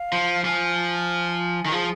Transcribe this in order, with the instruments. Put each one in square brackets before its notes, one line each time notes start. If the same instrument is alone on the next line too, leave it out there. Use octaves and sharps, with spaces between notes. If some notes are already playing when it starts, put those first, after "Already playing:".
Already playing: [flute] F5
[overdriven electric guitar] F3
[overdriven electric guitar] F3 [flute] G#5
[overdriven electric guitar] D#3
[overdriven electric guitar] F3 [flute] G#4